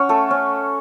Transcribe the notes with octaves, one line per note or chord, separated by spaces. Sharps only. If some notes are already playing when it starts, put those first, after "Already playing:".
Already playing: C#4 C#5 F#5
A3 A4
C#4